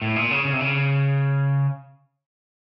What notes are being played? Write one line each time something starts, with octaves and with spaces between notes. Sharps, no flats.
A2
A#2
C#3
C#3
C3
C#3